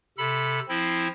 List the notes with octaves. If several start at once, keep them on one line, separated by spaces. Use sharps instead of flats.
C3 A4 B5 E6
F3 C4 E4